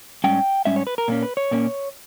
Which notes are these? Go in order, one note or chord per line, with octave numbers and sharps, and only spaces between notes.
G#2 G3 C#4 G5
G#2 G3 C#4 E5
C#5
B4
A#4
A#2 A#3 C#4
B4
C#5
A#2 A#3 C#4